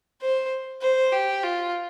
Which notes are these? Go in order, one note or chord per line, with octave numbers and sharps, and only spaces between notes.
C5
C5
G4
F4